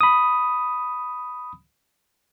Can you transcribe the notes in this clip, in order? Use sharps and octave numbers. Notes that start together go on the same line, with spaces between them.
B5 D#6